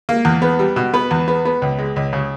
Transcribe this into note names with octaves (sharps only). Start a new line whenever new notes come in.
A#3
E2
B3
G3
B2
B3 B4
E2
B3
B3
C#2
G#3
C#2
C#3